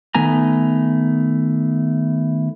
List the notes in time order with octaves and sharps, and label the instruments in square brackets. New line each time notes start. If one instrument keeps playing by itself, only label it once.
[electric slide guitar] D#3 A3 B3 G#5 A#5